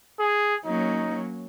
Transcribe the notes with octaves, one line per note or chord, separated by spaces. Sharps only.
G#4
F#3 A#3 C#4 D#4